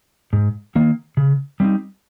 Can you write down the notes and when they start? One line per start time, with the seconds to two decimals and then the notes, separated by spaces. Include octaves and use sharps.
0.33 G#2
0.75 D#3 A#3
1.17 C#3
1.60 G3 C4 D#4